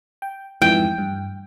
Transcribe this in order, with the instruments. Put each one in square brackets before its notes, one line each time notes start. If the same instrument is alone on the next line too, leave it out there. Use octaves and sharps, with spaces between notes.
[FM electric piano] G5
[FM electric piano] F2 G#2 E3 [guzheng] G5
[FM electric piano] G2